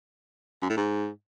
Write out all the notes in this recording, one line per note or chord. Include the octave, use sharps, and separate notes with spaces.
F#2
A2
G#2